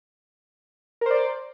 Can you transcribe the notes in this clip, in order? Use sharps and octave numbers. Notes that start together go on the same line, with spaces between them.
A#4 C5 D5